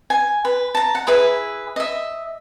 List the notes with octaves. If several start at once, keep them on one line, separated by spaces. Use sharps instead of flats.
G#5
B4
A5 A#5
F#5
E4 G#4 B4 E5
D#5 E5